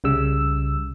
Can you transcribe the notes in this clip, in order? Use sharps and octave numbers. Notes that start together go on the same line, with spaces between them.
C2 C#3 G3 E6